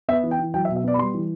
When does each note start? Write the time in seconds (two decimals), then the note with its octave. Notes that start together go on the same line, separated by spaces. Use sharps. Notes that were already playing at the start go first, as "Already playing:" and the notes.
0.08 B3 E5
0.23 E3
0.31 G5
0.39 E3
0.54 F#3 G5
0.65 E5
0.69 B2
0.76 E5
0.84 B3 D5
0.94 B5
0.99 G3 C6
1.14 E3